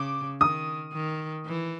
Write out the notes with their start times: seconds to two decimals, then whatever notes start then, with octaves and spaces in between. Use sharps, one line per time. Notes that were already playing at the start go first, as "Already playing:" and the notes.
Already playing: C#3 D6
0.41 D#3 D#6
0.93 D#3
1.46 E3